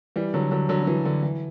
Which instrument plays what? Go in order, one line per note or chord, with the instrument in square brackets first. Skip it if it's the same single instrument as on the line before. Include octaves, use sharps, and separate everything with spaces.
[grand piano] E3 G3
D3 F#3
D3 F#3
D3 F#3
F#3
E3
D3
E3